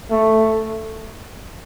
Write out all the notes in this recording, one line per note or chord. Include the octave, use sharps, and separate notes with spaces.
A3